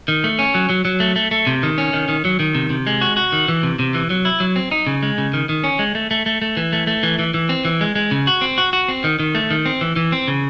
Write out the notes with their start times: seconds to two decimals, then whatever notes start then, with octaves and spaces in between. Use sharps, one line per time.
0.08 D#3
0.24 A3
0.39 C#4
0.55 F#3
0.69 F#3
0.85 F#3
1.00 A3
1.16 A3
1.31 A3
1.47 C3
1.63 D#3
1.78 C#4
1.93 D#3
2.09 D#3
2.25 F#3
2.40 D#3
2.55 C3
2.70 C3
2.87 G#3
3.01 F#4
3.17 F#4
3.32 D#3
3.48 E3
3.63 C3
3.79 C3
3.94 E3
4.10 F#3
4.25 E4
4.40 F#3
4.56 C4
4.71 D#4
4.87 C#3
5.03 G#3
5.18 C#3
5.33 D#3
5.49 D#3
5.64 C#4
5.79 G#3
5.95 A3
6.11 A3
6.26 A3
6.42 A3
6.57 E3
6.73 A3
6.87 A3
7.03 E3
7.19 E3
7.34 E3
7.49 C4
7.65 E3
7.81 G#3
7.95 G#3
8.11 C#3
8.27 F#4
8.41 C4
8.58 F#4
8.73 F#4
8.88 C4
9.04 D#3
9.19 D#3
9.35 A3
9.51 D#3
9.66 C4
9.81 E3
9.96 E3
10.12 C4
10.28 C#3